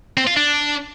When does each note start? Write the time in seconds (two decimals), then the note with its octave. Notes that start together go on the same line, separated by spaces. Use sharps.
0.17 C4
0.27 F4
0.36 D4